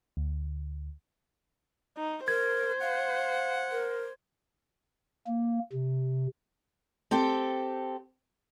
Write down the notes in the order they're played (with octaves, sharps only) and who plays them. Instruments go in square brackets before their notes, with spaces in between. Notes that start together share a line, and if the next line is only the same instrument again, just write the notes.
[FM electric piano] D2
[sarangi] D#4
[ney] A#4 [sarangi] C5 [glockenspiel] G#6
[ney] F5 [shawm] F#5
[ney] A#4
[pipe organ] A#3
C3
[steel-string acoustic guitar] C4 G4 A4 G5